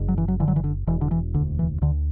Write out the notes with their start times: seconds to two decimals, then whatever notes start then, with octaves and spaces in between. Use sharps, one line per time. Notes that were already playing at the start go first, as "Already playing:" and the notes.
Already playing: F#1 C#3
0.09 F#3
0.18 E3
0.28 F#3
0.40 D3 E3
0.48 F#3
0.56 E3
0.64 D3
0.87 E1 E3
1.01 D3
1.11 E3
1.34 D2 D3
1.59 E3
1.82 D2 D3